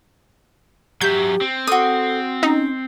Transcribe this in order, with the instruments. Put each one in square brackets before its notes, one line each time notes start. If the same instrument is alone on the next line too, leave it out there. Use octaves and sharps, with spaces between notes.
[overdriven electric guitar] F#3 E5 [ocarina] G4 [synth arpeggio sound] G6
[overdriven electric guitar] C4
[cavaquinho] F#4 D#6 [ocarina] A4
[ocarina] C#4 [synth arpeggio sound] D#4